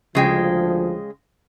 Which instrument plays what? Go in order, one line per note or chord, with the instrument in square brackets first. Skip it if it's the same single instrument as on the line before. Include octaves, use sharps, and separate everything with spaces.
[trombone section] D2 F3 [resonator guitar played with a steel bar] C#3 G#3 G5